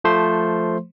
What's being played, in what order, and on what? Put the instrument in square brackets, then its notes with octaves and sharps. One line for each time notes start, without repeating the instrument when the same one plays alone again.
[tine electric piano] F3 A3 C5 C6